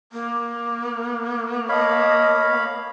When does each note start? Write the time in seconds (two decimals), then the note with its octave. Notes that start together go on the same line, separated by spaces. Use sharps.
0.12 A#3
1.69 C#5 D#5 F5 A5 B5 D#6